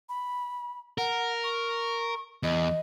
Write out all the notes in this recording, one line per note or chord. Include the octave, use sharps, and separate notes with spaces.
B5
A#4 F#5
C#6
E2 D#5